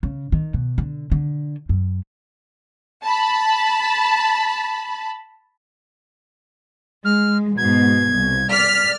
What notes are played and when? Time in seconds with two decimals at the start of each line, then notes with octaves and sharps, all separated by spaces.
0.03 C#3
0.32 D#3
0.54 B2
0.78 D3
1.12 D3
1.69 F#2
3.02 A5 B5
7.05 G#3 F6
7.58 G#2 B2 G#6
8.13 C2
8.50 D5 F6 B6